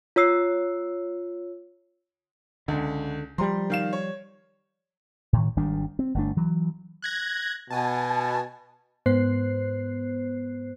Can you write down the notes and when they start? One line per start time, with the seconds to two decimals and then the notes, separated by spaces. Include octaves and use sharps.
0.16 F4 C#5 E6 C7
2.68 C#2 D3
3.38 F3 G3 A#5 C6
3.70 D#3 F5 E7
3.93 C#5
5.33 A2 D#3
5.57 G#1 D#3 G3 D4
5.99 C4
6.15 G1 A3 D4
6.37 E3 F#3
7.02 F#6 G#6 A#6
7.70 B2 G#5 A5
9.06 G#2 B3 C5 F#6 C7